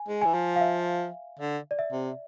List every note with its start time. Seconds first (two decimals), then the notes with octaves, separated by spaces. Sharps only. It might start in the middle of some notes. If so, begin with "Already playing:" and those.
Already playing: G#5
0.08 G#3
0.22 E3 G#5
0.34 F3
0.56 F5
0.61 E5
1.39 D3
1.71 D5
1.79 E5
1.92 C3